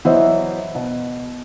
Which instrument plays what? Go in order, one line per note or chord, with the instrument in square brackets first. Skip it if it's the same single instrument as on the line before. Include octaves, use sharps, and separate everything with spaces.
[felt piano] E3 F#3 C5 D#5 E5
B2